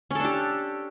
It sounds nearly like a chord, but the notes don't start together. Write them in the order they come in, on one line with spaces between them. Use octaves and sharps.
C#4 A4 D4 G4